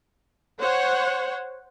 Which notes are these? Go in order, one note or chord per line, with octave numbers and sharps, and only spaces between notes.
C5 C#5 F#5